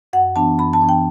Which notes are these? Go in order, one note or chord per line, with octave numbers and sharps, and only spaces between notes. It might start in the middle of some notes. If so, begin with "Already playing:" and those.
F#2 F#5
E3 B3 D4 A5
F#2 B5
A5
E3 B3 D4
G5